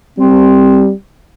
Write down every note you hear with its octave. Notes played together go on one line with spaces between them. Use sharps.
G3 C4